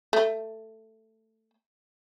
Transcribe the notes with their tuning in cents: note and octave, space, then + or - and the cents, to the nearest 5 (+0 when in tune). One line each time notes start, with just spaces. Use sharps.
A3 +10